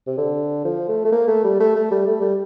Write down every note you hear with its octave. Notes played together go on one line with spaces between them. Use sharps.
C3
D3
F3
A3
A3
A#3
A3
G3
A3
A3
G3
A3
G3